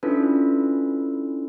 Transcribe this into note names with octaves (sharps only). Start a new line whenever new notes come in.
C#4 D4 E4 F4 A4 B4